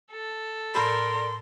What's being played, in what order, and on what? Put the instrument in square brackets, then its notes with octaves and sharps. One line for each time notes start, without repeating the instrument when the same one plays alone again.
[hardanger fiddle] A4
[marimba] A2 B5 [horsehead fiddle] A#4 D5 [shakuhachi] C6